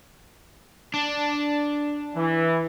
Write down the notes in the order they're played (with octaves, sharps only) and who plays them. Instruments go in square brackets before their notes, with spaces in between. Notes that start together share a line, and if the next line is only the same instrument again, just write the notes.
[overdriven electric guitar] D4
[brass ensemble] E3